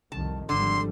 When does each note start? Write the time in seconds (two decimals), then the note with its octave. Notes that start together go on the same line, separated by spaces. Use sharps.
0.12 C2 F2 D#3 A5
0.49 G#1 D3 F3 G3 C6